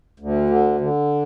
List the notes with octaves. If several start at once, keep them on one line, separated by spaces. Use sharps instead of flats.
D2
D3
D3